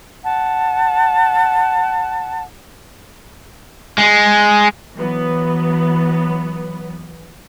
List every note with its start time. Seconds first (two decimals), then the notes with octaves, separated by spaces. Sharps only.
0.23 F#5 A5
3.98 G#3
4.94 E3 F#3 B3